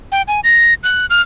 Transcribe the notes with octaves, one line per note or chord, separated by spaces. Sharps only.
G5
G#5
A#6
F#6
F6